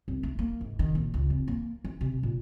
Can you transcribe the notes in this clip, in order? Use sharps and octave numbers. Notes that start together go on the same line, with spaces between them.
C2
A3
A#3
G#2
D#3
A#2
C#2
F1
A#3
E3
C3
A#2